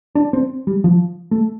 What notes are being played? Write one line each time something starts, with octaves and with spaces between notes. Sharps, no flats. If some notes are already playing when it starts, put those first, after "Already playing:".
D4
C4
G3
F3
A3